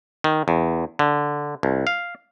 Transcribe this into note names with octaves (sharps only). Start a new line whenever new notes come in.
D#3
E2
D3
C2
F5